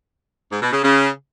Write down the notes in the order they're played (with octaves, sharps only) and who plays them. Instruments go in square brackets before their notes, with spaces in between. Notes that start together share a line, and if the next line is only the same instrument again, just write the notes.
[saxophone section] G#2
B2
C#3
C#3